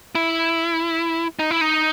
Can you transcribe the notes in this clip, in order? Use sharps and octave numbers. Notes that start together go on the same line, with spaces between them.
E4
D#4
E4
D#4